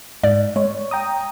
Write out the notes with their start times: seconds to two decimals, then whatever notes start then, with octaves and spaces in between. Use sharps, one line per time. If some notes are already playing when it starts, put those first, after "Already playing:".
0.23 G#2 D5
0.56 G#3 C#5
0.91 G5 A#5 D#6